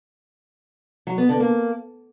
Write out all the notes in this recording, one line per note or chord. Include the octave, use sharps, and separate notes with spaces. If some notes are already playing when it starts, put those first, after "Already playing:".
F#3
B3
D3
A#3